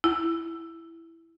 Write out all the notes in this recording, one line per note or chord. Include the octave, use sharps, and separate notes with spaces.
E4